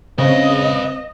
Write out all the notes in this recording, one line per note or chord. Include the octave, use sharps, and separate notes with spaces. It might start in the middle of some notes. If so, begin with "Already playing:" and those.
C#3 C4 B4 D#5 F5